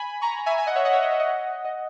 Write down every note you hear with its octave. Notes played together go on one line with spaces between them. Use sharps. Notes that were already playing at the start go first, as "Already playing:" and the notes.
Already playing: G#5 B5
A#5 C#6
E5 G#5
E5 G#5
D#5 F#5
C#5 E5
D#5 F#5
C#5 E5
D#5
C#5 E5
D#5 F#5
D#5